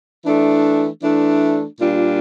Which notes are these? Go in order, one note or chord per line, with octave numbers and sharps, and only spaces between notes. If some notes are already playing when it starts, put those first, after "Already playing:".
E3 A3 D4
E3 A3 D4
A#2 G3 D4 F4